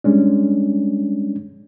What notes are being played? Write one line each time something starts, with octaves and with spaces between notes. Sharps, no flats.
G3 G#3 C#4 D4